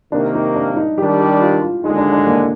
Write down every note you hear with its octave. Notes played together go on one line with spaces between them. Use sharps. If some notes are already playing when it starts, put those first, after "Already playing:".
C3 D#3 A#3 D4
D#4
D4
D#4
D#3 G3 D4 G4
G4
F4
F4
D#2 D3 G#3 D#4
D4
D4
A#3